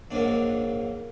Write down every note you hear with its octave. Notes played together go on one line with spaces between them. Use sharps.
A#1 G#2 F#3 A#3 D4